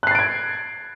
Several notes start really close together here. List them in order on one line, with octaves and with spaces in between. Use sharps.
F#6 C7 A6 D7 G#6